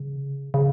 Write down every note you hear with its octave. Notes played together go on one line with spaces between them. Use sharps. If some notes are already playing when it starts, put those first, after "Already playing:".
Already playing: C#3
C#3